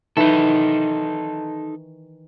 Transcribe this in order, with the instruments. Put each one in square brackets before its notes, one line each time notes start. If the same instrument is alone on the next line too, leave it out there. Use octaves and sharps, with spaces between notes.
[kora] D#3 E3 [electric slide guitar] D#4 A4